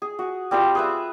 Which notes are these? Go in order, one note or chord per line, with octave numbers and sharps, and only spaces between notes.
G#4
F#4
G3 C4 F4 G5
G#4 B4 E5